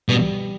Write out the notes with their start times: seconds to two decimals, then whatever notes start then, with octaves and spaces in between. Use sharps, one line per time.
0.09 B2 G3